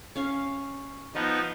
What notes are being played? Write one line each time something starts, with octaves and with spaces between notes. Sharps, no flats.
C#4 F5
F3 B3 D#4 D#5